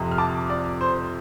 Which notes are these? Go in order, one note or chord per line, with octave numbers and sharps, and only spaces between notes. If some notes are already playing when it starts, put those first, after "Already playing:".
Already playing: F2 C3 F3
F6
A5 D6
D5
C5